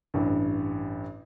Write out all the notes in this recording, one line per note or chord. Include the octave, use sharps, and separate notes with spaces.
A1 G2